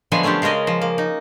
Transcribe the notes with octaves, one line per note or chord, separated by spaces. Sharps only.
D3 F3 F#3 G#3 B3 G#5
A3 C#4 D4 F4 G4
C#3 G#3 C#4 A#4 D#5
F3
A#3
D#4